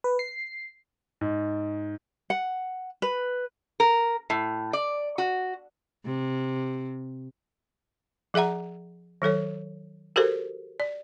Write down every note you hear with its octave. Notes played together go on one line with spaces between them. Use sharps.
B4
C7
G#2
F#5
B4
A#4
A2
D5
F#4
C3
F3 G#4 E5 F#5 A#5
D#3 F#3 A4 C#5
F#4 G4 A4 A#4 C5
D5